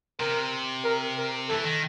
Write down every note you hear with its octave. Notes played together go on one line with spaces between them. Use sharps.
C3 A#4
A#4
A#4
E3 A4
D#3